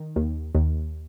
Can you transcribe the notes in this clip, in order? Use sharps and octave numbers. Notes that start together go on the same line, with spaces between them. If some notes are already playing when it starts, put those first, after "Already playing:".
Already playing: D#3
D#2
D#2